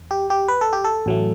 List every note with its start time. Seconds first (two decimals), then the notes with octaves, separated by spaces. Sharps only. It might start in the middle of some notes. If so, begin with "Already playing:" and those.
Already playing: E2
0.11 G4
0.30 G4
0.48 B4
0.61 A4
0.73 G4
0.84 A4
1.06 A1 A2 F#3 A3